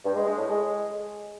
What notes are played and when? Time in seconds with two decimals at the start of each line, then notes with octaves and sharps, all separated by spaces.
0.05 G2
0.16 G#3
0.27 G#3
0.38 A2
0.49 G#3